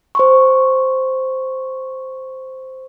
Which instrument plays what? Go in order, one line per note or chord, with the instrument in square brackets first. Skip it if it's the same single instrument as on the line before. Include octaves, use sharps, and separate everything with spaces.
[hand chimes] C5 C6 C#6